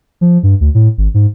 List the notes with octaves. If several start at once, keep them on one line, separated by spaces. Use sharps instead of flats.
F3
G2
D2
A2
G#1
G#2